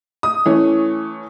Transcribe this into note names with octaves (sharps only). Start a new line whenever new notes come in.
D#6
E3 A3 C#4